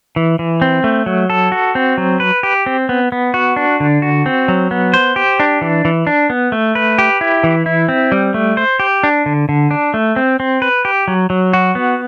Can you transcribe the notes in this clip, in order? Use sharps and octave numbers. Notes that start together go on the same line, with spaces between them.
E3
E3
C4
A3
F#3
A4
F#4
C4
F#3
B4
G4
C4
B3
B3
F#4
D4
D3
F#4
C4
F#3
B3
C5
G4
D4
E3
E3
D4
B3
A3
B4
G4
E4
E3
E4
C4
G3
A3
C5
G4
D4
D3
D3
D4
A3
C4
C4
B4
G4
F#3
F#3
F#4
B3